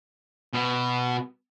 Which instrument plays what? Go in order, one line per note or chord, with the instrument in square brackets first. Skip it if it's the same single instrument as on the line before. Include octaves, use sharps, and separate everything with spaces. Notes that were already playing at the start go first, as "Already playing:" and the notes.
[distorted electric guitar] B2